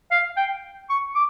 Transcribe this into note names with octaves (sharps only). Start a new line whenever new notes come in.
F5
G5
C#6
D6